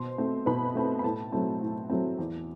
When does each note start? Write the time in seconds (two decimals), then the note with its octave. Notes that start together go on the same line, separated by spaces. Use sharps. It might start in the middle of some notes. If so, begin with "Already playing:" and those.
Already playing: B2 C5 C6
0.18 A3 C4
0.46 B2 B4 B5
0.75 A3 C4
0.99 B5
1.04 A2 A4 A5
1.32 F#3 A3 C4
1.62 A2
1.90 F#3 A3 C4
2.18 E2